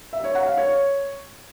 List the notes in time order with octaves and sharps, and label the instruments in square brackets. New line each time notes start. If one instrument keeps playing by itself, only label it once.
[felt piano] E5
C#5
F#5
F5
C#5